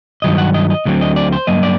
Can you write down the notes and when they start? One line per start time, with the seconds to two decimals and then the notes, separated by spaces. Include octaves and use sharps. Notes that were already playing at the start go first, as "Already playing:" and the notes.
0.22 G2 D#3 F#3 D#5
0.38 F#5
0.54 D#5
0.70 D#5
0.85 D2 D3 F#3 C4
1.01 D#5
1.16 D5
1.32 C5
1.47 G2 F#3 A#3 D#5
1.63 D5